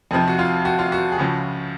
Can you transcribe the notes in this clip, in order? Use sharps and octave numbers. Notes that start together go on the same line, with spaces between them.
F2 C3 F3 D#4
F#4
F4
F#4
F4
F#4
G#4
C#2 C#3 F3 F#4